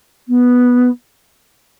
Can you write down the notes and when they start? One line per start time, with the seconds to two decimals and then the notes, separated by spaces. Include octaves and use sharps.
0.28 B3